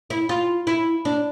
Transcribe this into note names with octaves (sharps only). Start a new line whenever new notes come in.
E4
F4
E4
D4